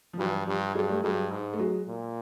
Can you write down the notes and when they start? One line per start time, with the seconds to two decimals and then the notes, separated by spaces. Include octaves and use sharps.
0.13 F3
0.18 G2 E3 F#3
0.47 G2 F3 G3
0.75 G2 F#3 G#3
0.89 G3 A3
1.03 G2 F#3 G#3
1.31 G#2
1.53 A3
1.59 F#3 G#3
1.88 A#2